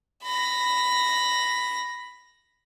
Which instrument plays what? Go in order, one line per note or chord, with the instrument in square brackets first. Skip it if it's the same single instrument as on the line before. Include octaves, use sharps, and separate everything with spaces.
[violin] B5 A#6